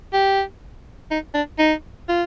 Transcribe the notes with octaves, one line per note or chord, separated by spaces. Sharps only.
G4
D#4
D4
D#4
F4